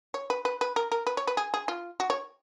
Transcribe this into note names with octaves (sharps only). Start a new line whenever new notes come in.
C#5
B4
B4
B4
A#4
A#4
B4
C#5
B4
G#4
G#4
F4
F#4
C#5